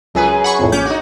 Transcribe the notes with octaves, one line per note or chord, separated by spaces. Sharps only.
C#2 F#2 G#4 B4
F#5 B5 C#6
C2 F2 A2
A#1 C#4 D6 G6
D#4 F#4